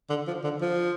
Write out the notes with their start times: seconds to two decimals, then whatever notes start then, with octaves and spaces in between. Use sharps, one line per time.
0.10 D3
0.27 F3
0.44 D3
0.61 F3